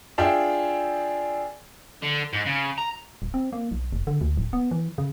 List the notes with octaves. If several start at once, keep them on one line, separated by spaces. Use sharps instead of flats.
D4 F4 G#4 E5 G5
D3
G#2
C#3
A#5
D#1
C4
A#3
B1
F1
D3
D2
D1
B3
E3
C#3